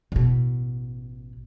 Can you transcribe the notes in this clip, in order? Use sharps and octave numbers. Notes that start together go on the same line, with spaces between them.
A1 B2